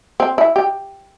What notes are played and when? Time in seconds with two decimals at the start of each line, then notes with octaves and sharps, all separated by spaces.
0.20 C4
0.38 E4
0.56 G4